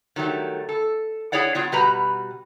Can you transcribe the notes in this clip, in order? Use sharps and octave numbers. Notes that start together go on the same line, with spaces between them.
D#3 F#3 G3 A3
A4
E4 G#4 C#5 D5 F#5
F#3 B3 F4
B2 G3 F#4 B4 A#5